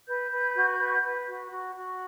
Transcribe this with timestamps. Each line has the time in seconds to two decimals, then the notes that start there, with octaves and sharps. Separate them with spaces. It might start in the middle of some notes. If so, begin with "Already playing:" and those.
0.07 B4 G6
0.32 B4
0.55 F#4
0.79 B4
1.03 B4
1.28 F#4
1.52 F#4
1.75 F#4